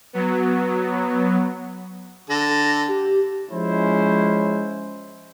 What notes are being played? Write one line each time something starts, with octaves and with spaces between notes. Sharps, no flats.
F#3 B3
D3 A4 A#6
G4
F3 G#3 C#4 E4 C5